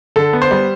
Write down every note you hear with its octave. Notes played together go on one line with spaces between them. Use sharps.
D3 A4
B3
C5
G3